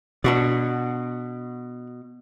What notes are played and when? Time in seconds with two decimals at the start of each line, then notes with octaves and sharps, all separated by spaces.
0.24 B2 D4 F#4 D5